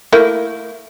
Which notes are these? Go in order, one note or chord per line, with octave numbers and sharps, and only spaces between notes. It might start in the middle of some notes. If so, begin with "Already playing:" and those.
A3 A#3 E4